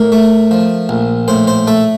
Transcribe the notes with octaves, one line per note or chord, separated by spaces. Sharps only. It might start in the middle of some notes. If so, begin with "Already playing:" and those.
Already playing: A2 A#4
A3
F3
A#1
A2 C5
C5
A3 A4